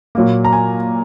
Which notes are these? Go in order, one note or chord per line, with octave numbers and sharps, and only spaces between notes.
A#2 F#3 A#3
A#5
G#5